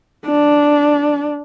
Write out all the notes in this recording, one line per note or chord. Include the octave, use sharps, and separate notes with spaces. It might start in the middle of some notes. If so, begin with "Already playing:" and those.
D4